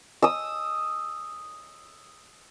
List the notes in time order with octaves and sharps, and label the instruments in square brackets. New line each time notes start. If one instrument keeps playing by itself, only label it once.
[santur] D#6 E6